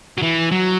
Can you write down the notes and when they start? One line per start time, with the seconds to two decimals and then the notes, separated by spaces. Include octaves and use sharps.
0.18 F#3
0.22 E3
0.52 F#3